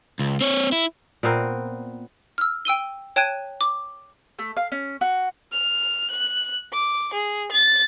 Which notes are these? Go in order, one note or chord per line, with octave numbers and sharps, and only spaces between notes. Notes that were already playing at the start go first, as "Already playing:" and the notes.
C#2
C4 C#5
E4
A#2 B3 C4 A#4
E6 F6
G5 E6 D#7 G7
C#5 G5 A5 F#6 G#6 D#7
D6
A3
F5
C#4
F#4
F6
F#6
D6
G#4
A6